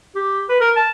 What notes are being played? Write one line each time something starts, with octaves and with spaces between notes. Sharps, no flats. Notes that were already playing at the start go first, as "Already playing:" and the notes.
G4
B4
A#4
A5